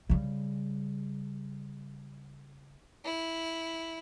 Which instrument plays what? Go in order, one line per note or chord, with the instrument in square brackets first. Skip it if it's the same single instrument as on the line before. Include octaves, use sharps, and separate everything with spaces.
[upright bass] C#3 G3
[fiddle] E4